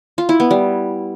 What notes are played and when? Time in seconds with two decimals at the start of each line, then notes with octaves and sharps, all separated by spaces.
0.18 F4
0.29 E4
0.40 B3
0.51 G3